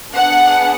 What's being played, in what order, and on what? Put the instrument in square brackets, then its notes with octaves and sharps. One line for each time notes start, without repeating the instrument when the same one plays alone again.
[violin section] B3 D4 G#4 F#5